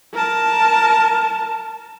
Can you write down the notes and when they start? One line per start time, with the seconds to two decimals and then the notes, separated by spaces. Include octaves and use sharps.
0.14 A#4 A5